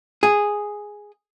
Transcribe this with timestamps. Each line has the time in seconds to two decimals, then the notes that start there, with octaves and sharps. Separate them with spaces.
0.23 G#4